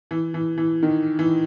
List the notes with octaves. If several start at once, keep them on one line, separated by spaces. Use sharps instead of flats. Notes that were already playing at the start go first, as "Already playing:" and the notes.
E3
E3
E3
D#3
E3